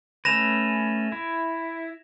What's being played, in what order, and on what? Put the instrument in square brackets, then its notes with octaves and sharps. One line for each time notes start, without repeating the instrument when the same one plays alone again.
[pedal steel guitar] A3 C#4 B4 [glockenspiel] A#6 E7 F7
[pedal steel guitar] E4